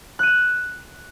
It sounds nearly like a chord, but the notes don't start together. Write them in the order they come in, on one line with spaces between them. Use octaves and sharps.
F#6 D#7 E7